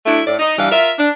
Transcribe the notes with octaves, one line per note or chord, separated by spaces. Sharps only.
F#3 A3 D4 E4
A2 D5
D#4
G2 E3 G3 F5
F4 A#4 E5
D4